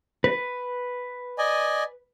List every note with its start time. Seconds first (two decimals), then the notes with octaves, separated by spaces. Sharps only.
0.24 B4
1.38 D5 D#5 G#5